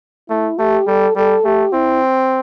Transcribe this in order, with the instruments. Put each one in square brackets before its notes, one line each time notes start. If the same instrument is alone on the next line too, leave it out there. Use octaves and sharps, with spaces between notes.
[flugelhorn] A3 [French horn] E4
[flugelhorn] A3 [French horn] G4
[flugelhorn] G3 [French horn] A4
[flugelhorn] G3 [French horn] A4
[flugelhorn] A3 [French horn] G4
[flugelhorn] C4 [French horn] E4